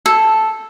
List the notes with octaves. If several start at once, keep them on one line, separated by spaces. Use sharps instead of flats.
A4